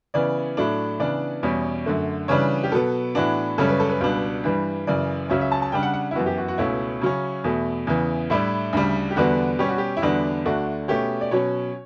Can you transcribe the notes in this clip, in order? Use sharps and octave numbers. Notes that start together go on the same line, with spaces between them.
C#3 E3 B3 D5
A2 F#3 A3 D4
C#3 E3 B3 D4 D5
E2 B2 G3 C#4
F#2 D3 A3
C#3 E3 G3 D4 C#5
G4
B2 F#3 B3 A4
A2 E3 B3 D4 F#4
F#2 C#3 G3 C#4 A4
B4
A4
B4
C#2 B2 G3 D4
G2 E3 G3
F#2 C#3 E3 D5
C#2 C#3 F#3 C#4 E5
E5
A5
A5
C#3 G3 D4 G5
F#5
F#5
E4
F#2 E3 B3 F#4
G4
F#4
F#4
C#2 B2 A3 C#4 E4
C#3 F#3 C#4
E2 B2 A3
E2 C#3 E3
A2 G3 D4 E4
D2 C#3 G3
G4
E2 D3 G3 B3 D4 F#4
B2 G3 C#4 G4
F#4
G4
E4
E2 D3 G3 B3 D4 F#4
D2 D3 A3 D4 F#4
B2 A3 C#4 G4
D5
B2 F#3 C#4 C#5